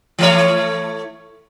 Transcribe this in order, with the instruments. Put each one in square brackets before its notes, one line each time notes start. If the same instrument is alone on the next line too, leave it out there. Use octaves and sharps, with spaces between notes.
[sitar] E3 A3 C#5